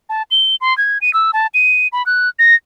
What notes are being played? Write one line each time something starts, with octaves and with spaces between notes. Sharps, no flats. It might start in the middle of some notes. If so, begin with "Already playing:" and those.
A5
G7
C6
G#6
D#7
E6
A5
D#7
B5
F#6
A#6